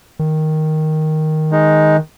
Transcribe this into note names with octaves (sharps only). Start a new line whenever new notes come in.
D#3
G#3 D#4